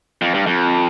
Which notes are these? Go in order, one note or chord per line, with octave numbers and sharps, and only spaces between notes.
F2
G2
F2